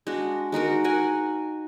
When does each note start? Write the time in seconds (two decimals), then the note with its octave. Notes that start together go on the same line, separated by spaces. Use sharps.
0.07 G#3 D4 F#4
0.52 G#3 D#4 F#4 A#4
0.84 F#4 A#4 F#5 G#5